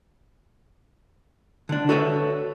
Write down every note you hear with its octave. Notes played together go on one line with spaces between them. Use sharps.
D3 D4
F#4 A4 B4 C#5 E5